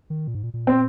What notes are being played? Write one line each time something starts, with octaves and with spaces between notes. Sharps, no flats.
D#3
A#2
G#2
A#2
A#2
C4